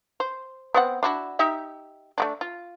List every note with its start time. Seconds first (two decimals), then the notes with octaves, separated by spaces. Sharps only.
0.20 C5
0.74 B3 C4 F#5
1.03 D4 E4 F#4
1.39 D#4 G4 E5
2.18 A3 A#3 D4
2.41 F4